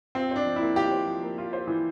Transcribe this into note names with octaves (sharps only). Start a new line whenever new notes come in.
C4 F4
D4 C5
F3
A#3 E4
F4 G4
C5
F3
A#3
F4
C5
E3